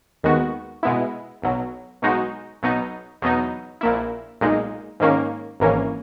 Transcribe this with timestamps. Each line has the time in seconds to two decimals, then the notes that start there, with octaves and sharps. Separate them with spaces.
0.23 D#2 D#3 G#3 B3 F#4
0.83 B2 G#3 B3 E4
1.42 B1 B2 F#3
2.02 B1 B2 G#3 D#4 F#4
2.62 B1 B2 F#3 B3 D#4
3.22 E2 B2 F#3 B3 D#4
3.81 A#1 A#2 A#3 E4
4.41 B1 A#2 G#3 D#4
5.00 G#2 D#3 A#3 C#4
5.60 G#1 G#2 E3 A#3 C#4